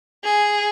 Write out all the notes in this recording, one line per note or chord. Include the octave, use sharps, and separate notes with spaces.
G#4